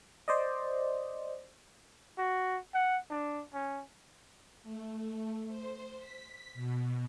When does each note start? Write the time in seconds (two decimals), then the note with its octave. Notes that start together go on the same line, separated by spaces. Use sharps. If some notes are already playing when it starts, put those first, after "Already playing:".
0.28 C5 D5 D#5
2.18 F#4
2.74 F#5
3.10 D4
3.53 C#4
4.63 A3
5.48 C5
5.98 B6
6.54 B2